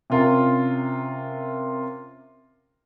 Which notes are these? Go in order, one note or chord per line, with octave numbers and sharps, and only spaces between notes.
C3 C#4 F4 A#4